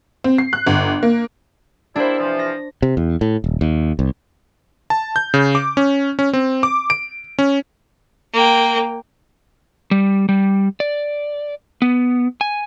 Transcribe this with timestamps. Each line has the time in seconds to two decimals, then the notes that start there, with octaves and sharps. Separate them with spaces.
0.24 C4
0.38 C7
0.53 F#6
0.67 G1
1.03 A#3
1.96 G3 A#3 D4 E4 C5
2.18 C3 E3 F3
2.39 A#6
2.82 C3
2.97 E2
3.21 A2
3.44 D#1
3.61 D#2
3.99 C2
4.90 A5
5.16 G6
5.34 C#3
5.55 D6
5.77 C#4
6.19 C#4
6.33 C4
6.63 D6
6.90 D7
7.39 C#4
8.33 A#3 G5
9.91 G3
10.29 G3
10.80 D5
11.82 B3
12.41 G#5